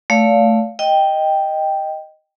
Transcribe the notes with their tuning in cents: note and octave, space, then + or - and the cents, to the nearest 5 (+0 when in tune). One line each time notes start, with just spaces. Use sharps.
A3 +0 D5 -40 F5 +0
D#5 +0 G5 +0